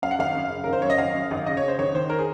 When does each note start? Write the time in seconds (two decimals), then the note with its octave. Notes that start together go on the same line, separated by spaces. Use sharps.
0.02 F#2 F5
0.11 F#5
0.19 G#1 F5
0.35 F#2
0.50 C#3
0.64 G#1 A#4
0.73 C5
0.82 F#2 C#5
0.90 D#5
0.98 G#1 F5
1.15 F#2
1.31 G#1
1.46 C#3 D#5
1.57 C#5
1.63 C#3
1.68 C5
1.79 G#1 C#5
1.95 D#3 C5
2.10 A#4
2.19 G#4